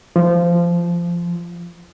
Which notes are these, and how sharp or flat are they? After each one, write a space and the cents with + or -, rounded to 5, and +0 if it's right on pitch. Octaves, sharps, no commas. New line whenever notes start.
F3 -15